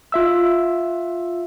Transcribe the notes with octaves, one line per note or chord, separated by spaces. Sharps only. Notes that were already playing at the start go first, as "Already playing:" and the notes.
F4 E5 E6